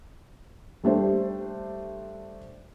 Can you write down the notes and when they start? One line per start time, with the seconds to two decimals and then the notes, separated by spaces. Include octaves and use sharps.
0.84 G3 A3 D4 C5